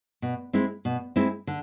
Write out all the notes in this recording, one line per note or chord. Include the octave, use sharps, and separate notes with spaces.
B2
G#3 C4 E4
B2
G#3 C4 E4
D3